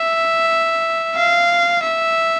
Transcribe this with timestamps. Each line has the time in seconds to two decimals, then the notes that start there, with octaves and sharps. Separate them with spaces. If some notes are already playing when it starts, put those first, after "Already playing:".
Already playing: E5
1.16 F5
1.84 E5